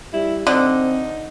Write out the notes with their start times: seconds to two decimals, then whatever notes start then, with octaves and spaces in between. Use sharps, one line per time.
0.13 G3 E4
0.47 D3 C4 D#4